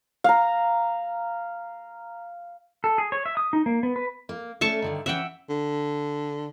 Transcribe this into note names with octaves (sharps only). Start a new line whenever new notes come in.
F5 A#5
A4
G#4
C#5
E5
D#6
D#4
A#3
B3
B4
A#3
A3 C#4 D5 E5 A5 C#6
G2 D3 D#3
E3 C#4 E5 F#5 G5
D3